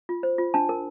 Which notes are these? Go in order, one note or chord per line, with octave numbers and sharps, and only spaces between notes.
F4
C5
F4
D4 A5
A#4